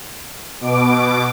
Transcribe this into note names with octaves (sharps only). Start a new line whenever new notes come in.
B2 D6